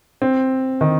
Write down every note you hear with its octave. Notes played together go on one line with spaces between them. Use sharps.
C4
D#3